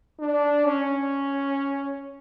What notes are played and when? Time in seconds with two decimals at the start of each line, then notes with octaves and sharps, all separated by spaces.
0.20 D4
0.66 C#4